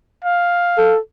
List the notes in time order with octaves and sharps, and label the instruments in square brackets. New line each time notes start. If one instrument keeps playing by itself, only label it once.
[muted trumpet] F5
[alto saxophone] A4